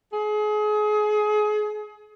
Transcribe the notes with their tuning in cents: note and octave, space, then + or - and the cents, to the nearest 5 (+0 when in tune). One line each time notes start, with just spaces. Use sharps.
G#4 +30